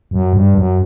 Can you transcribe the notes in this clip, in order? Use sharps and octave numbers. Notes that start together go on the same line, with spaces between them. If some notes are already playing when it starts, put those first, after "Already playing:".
F#2
G2
F#2